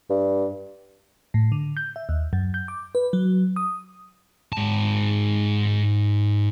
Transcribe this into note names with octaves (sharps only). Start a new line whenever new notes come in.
G2
A2
D3
G6
E5
D#2
F#2
G6
D6
B4
F#3
D#6
G#2 A5